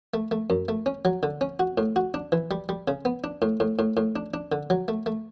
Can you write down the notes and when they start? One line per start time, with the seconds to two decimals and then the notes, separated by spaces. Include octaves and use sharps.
0.14 A3
0.31 A3
0.50 F#2
0.69 A3
0.86 C#4
1.05 F#3
1.23 D3
1.41 C#4
1.60 F#4
1.78 A2
1.96 F#4
2.14 D4
2.32 E3
2.51 G3
2.69 G3
2.88 C#3
3.05 B3
3.24 D4
3.42 A2
3.60 A2
3.79 A2
3.97 A2
4.16 D4
4.34 D4
4.52 D3
4.70 F#3
4.88 A3
5.06 A3